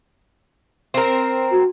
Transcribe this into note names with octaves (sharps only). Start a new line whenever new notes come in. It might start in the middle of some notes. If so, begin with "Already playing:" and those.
C4 A#4
F#4